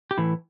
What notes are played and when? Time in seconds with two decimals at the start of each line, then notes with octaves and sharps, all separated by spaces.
0.11 G4
0.18 A2 E3 E4